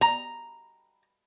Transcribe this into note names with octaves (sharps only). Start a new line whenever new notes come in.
A#5